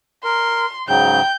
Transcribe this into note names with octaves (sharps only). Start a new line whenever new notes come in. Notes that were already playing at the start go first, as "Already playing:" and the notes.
A#4 C6
G#2 C#3 F#3 G5 G6